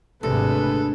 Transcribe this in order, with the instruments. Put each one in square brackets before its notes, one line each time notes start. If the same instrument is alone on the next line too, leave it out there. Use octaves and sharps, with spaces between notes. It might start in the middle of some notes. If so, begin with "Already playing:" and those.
[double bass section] G#1 C3 [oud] D2 [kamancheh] G#4 B4 [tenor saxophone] A4